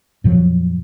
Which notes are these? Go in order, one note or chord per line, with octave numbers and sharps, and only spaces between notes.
F2 A#2 F3 F#3